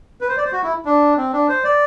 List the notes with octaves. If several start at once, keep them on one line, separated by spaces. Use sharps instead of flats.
B4
C5
D5
C5
F#4
E4
D4
C4
D4
C5
D5